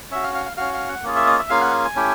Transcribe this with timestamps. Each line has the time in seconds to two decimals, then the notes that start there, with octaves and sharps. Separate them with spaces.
0.11 C#4 F#4 E5
0.23 F5
0.35 F5
0.46 F5
0.57 C#4 F#4 F5
0.74 F5
0.89 F#5
1.04 A#3 C#4 F4 G#4
1.16 E5
1.27 D#5
1.39 E5
1.50 A#3 C#4 F4 G#4 F5
1.61 F#5
1.85 G#5
1.96 A3 C#4 E4 G4